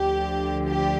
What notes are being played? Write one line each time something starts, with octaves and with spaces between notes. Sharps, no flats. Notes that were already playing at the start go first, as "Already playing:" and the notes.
Already playing: D2 D3 F3 G4
G4